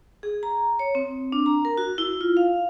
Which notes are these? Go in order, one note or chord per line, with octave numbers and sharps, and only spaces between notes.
G#4
A#5
C#5
C4
D4
A#5
A#4
F#4
E4
F4
F5